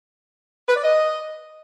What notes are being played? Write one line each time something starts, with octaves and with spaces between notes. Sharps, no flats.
B4
D5
D#5